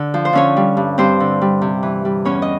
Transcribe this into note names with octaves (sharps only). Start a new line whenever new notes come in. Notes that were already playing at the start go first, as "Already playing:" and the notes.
Already playing: D3
F3
C5
D3 C#4 C#5
G3
G2
G2 C4 C5
D3
G3
C3
E3
G3
E2 C#4 C#5
D#5